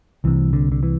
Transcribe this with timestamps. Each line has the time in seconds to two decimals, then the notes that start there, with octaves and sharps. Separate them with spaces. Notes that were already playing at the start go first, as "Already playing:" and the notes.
0.24 C2 C3 E3
0.53 D3
0.72 D3
0.83 E3